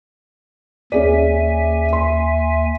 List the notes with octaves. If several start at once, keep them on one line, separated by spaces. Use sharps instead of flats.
D#2 C#4 G#4 D5 E5 G#5
C6